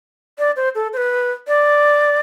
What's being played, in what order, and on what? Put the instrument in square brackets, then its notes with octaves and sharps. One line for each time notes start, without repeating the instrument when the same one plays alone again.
[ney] D5
C5
A4
C5
B4
D5